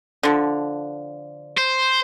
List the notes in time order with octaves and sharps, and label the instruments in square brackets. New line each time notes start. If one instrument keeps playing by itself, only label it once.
[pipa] D3 F3
[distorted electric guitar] C5